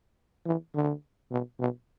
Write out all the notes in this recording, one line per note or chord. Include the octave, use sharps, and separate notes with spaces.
E3
D3
B2
B2